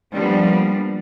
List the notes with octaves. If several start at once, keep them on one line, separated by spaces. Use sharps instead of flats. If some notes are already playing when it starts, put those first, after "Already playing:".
F3 G3 A#3 B3 D4